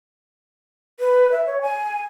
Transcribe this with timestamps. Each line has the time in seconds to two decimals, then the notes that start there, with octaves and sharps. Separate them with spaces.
1.00 B4
1.32 E5
1.46 C#5
1.62 G#5